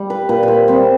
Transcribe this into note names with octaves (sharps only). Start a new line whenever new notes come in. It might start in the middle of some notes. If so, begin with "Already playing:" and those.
Already playing: G3
B4
A#2 B4
B4 C5
G3 C4 C5